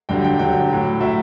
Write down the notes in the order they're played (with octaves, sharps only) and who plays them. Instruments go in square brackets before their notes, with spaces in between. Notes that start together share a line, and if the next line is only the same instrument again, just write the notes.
[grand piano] G2 D3 F#3 G5
G5
G2 D3 F#3 G5
A2 F#3
A2 F#3 E5